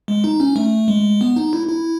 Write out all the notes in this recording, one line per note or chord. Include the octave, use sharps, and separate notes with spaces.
G#3
D#4
C#4
A3
G#3
B3
D#4
E4
E4